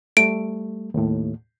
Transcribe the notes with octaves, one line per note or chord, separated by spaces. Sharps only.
G3 A3 D7
D#2 A2